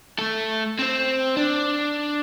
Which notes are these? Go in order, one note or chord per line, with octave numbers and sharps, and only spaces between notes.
A3 A4
C4 C5
D4